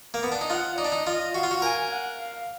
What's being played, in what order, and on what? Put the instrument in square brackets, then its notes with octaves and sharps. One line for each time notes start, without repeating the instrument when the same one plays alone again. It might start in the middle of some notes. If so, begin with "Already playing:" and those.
[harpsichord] A#3
B3
D4
D#4
[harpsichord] F4 [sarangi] F#5
[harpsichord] D#4 [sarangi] D5
[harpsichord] D4
D#4
[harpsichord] F4 [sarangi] D#5
[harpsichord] F#4 [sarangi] F5
[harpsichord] F4
F#4
[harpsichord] A#4 [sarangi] G#5
[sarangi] F#5
F5